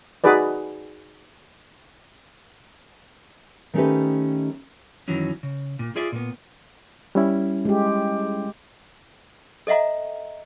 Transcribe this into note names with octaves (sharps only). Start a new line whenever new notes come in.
D#4 F#4 G#4 B4 D5
D#3 A3 C#4 D#4 G4 B4
F#2 D#3 E3 F#3 C#4
C#3
A#2
F4 G#4 D5 E5
A#2 B3
G3 C#4 E4
G#3 G4
A4 D#5 E5 F#5 A#5